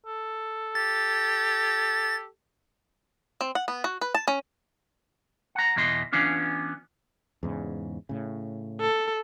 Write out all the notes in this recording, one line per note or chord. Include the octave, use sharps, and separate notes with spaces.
A4
G4 A6
C4
F#5
B3
F#4
B4
A5
C#4
F#5 A#5
E2 B2 E3 D#5 C6
E3 B3 C#4 D4 F4
E2 G#2 C#3
A2 C#3
A4